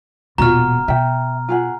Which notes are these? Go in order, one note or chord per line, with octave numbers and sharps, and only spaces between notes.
E1 A#2 F4 F#4 A#5 F6
B2 E5 G5
F4 G#4 F#5